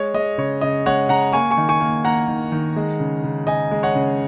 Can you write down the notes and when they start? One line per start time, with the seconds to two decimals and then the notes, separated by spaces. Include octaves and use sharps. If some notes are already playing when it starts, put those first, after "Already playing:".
Already playing: G#3 C#5
0.14 G#3 D#5
0.38 C#3 C#5
0.61 C#3 D#5
0.86 G#3 C#5 F#5
1.09 C#3 F#5 A#5
1.33 A#3 G#5 C#6
1.51 G#5 C#6
1.57 D#3
1.69 G#5 C#6
1.80 A#3
2.05 A#3 F#5 A#5
2.28 D#3
2.52 D#3
2.76 G#3
3.00 C#3
3.24 C#3
3.47 C#3 D#5 G#5
3.71 G#3
3.83 C#5 F#5
3.95 C#3